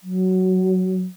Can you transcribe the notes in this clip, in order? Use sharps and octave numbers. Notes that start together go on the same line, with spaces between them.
F#3